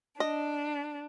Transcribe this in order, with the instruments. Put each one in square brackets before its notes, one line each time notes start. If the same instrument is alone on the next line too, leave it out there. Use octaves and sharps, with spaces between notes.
[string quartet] D4 [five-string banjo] D#5